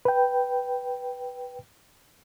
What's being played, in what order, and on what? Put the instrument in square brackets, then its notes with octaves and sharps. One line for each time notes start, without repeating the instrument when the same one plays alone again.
[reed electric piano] B4 G5